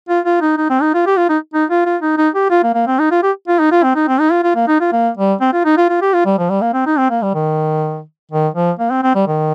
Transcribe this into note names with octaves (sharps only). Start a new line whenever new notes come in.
F4
F4
D#4
D#4
C4
D#4
F4
G4
F4
D#4
D#4
F4
F4
D#4
D#4
G4
F4
A#3
A#3
C4
D#4
F4
G4
F4
D#4
F4
C4
D#4
C4
D#4
F4
F4
A#3
D#4
F4
A#3
G3
C4
F4
D#4
F4
F4
G4
F4
G3
F3
G3
A#3
C4
D#4
C4
A#3
G3
D#3
D#3
F3
A#3
C4
C4
G3
D#3